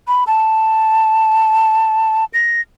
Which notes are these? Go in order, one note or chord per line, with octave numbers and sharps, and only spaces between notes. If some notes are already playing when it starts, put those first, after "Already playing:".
B5
A5
A#6